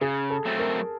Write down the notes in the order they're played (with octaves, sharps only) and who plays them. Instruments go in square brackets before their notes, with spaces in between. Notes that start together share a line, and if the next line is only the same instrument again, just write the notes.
[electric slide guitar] C#3 [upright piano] G#4
[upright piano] A4
[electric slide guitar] F#3 A3 C4
[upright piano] A#4